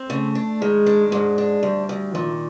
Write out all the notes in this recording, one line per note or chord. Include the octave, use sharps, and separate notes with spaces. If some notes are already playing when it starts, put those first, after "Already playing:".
Already playing: C4
C#3 A3
D4
D#3 G#3
D4
G#2 G#3
D4
D2 G3
D2
A#2 D#3